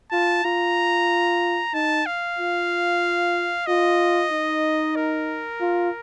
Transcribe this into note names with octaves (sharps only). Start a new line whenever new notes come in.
F4 A5
F4 A#5
D#4 A5
F5
F4
F4 D#5
D#4
A#4
F4